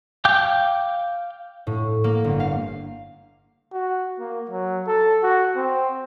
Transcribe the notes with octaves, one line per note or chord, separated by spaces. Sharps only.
F5 G5 D6 G6
A2
A#3
G1
F5
F#4
A#3
F#3
A4
F#4
C4